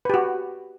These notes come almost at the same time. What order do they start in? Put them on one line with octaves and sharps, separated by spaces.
B4 G4 F#4